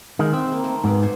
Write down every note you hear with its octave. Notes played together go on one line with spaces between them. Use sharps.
D#3 G#3
C4 E5 B5
A#3
D#3 A3
G#2 B2 D5
A4 C5 G#5